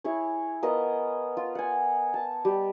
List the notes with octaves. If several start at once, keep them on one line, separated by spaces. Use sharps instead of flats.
E4 G#4 C#5
B3 F4 A#4 D#5
F4
F#5 G#5
A5
G3